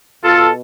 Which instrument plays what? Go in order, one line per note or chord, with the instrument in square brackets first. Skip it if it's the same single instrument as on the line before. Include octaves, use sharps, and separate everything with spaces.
[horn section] B2 F4 A4